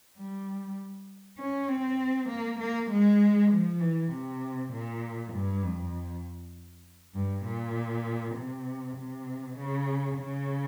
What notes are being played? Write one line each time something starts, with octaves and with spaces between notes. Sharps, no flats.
G3
C#4
C4
A#3
A#3
G#3
F3
E3
C3
A#2
G2
F2
G2
A#2
C3
C3
C#3
C#3